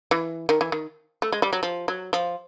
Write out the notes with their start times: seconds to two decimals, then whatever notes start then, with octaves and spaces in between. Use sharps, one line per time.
0.11 E3
0.49 D#3
0.61 E3
0.72 D#3
1.22 A3
1.32 G#3
1.42 G3
1.53 F#3
1.63 F3
1.88 F#3
2.13 F3